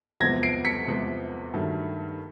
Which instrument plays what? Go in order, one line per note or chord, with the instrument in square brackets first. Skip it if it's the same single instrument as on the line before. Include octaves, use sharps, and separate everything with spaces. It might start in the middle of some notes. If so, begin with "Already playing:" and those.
[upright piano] E2 C3 F3 G#3 B3 [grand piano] G#6 A#6
[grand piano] C7 D7
B6 C#7
[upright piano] E2 C3 F3 G#3 B3
G2 D#3 F#3 A3